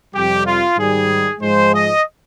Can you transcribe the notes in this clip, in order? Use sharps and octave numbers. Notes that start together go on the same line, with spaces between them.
F2 C3 G3 G4
F4
G#2 D#3 G3 G#4
G#2 F3 G#3 C5
D#5